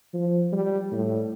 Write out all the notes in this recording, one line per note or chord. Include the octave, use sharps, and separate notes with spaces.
F3
G3
A2